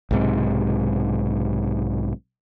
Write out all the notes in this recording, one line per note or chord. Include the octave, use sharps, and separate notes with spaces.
B1 G#2 C3